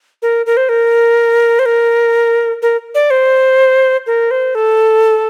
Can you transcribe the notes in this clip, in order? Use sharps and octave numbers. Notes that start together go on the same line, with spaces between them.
A#4
A#4
C5
A#4
C5
A#4
A#4
D5
C5
A#4
C5
A4